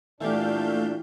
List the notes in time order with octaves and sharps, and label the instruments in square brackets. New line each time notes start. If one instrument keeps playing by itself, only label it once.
[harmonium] A#2 D4 [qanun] E3 G4 [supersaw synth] A3 F5 G6